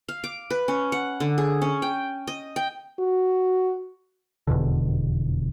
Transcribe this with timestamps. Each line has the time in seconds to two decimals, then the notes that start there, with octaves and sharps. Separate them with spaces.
0.09 F5
0.24 D6
0.50 B4
0.68 C#4
0.92 F#5
1.20 D3
1.38 G#4
1.62 C#4
1.82 G5
2.27 D#5
2.56 G5
2.99 F#4
4.47 F1 E2 B2 D3